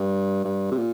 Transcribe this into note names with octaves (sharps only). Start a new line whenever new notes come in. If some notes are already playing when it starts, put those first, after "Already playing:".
Already playing: G2
G2
C3
A#2